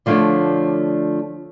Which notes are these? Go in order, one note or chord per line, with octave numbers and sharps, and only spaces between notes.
D3 F3 A3 D4 C#5 D5